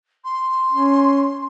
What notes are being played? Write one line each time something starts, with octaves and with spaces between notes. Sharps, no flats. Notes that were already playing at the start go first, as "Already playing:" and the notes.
C6
C#4